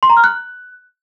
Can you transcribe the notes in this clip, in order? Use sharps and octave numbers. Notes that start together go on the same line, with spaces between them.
C6
A#5
F6
F#6